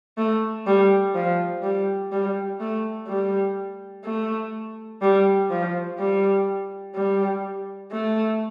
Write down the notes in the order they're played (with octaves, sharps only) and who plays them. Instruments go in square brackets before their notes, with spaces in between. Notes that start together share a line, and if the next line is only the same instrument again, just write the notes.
[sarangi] A3
G3
F3
G3
G3
A3
G3
A3
G3
F3
G3
G3
A3